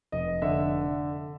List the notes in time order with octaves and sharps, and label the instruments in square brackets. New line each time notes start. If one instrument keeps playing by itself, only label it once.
[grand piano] F1 D#5
D3 E5